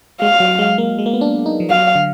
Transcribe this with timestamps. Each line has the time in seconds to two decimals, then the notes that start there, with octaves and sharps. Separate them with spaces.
0.22 G#3 F5
0.40 F#3
0.59 G#3
0.78 A#3
0.99 G#3
1.06 A#3
1.13 B3
1.21 D4
1.46 D#4
1.60 F3
1.70 F#3 F5
1.95 D3